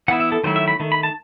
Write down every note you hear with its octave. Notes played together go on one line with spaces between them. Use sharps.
E3 B3 E4 F#5
E5
A4
D#3 F#3 A3 E4 C5
E5
B5
D#3 A3
B5
A5